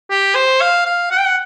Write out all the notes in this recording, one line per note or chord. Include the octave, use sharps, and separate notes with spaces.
G4
C5
F5
F5
F#5
G5
F#5